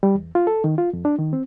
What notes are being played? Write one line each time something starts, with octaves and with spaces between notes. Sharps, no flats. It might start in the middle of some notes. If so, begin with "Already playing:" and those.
G3
E2
F4
A4
D#3
F4
F2
D4
D#3
C4